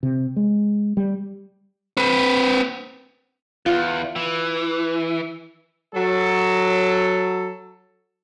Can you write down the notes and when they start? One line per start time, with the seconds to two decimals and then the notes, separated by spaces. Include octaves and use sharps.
0.03 C3
0.36 G#3
0.97 G3
1.97 C4 B4
3.66 E2 F4
4.16 E3
5.94 F#3 A4